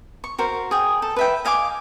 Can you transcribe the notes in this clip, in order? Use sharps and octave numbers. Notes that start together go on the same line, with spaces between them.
C#6
F#4 A#4 C5
G#4 G5
A4
B4 E5 G5
D#5 F5 G#5 D6